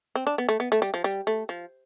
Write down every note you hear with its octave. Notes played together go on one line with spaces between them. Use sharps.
C4
D4
B3
A3
B3
A3
G3
F3
G3
A3
F3